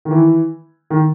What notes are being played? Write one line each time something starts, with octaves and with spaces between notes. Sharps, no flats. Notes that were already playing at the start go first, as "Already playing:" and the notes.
D#3
E3
D#3